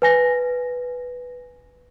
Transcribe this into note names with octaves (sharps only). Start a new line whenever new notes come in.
B4 G#5 A#6